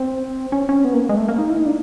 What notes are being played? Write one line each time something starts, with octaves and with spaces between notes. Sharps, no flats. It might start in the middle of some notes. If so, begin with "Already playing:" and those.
Already playing: C4
C#4
C#4
B3
A#3
G#3
A3
A#3
D#4
E4
D#4
D4